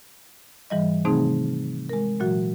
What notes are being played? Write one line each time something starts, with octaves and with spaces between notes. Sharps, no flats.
G#2 E3 G3 D#5
C3 D#3 A3 C4 D#4 G#4
G#3 A#4
A#2 E3 F#3 F#4